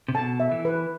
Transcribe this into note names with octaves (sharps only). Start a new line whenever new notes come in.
C3
B2 A5
E5
E3
B4